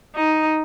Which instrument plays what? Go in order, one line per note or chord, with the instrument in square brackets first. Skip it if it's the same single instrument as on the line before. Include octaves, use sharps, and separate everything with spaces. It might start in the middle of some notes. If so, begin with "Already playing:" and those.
[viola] D#4